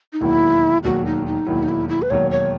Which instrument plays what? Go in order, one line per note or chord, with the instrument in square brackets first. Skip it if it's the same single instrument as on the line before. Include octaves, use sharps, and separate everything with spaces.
[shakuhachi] D#4
[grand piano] E1 D#2 D#3 F#3 [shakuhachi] E4
[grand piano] E1 D#2 D#3 F#3 [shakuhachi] F#4
[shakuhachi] D#4
D#4
[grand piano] E1 D#2 D#3 F#3 [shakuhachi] E4
[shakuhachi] D#4
E4
E4
B4
[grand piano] E1 D#2 D#3 F#3 [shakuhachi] C#5
[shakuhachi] C#5